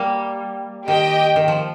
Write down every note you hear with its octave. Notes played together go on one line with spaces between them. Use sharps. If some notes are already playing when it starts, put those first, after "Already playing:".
Already playing: G3 A#3
D#3 G4 D#5 G5
D#3
F3